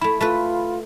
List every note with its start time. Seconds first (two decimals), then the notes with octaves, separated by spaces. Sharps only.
0.01 A3 E4 B5
0.20 A3 F4 A4 B4